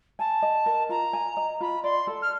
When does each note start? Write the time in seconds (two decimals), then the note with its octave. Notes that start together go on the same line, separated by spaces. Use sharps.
0.19 G#5 A5
0.42 D#5
0.66 A#4
0.89 F4 A#5
1.13 G#5
1.37 D#5
1.60 F4 B5
1.83 D5 C6
2.07 A4
2.22 F6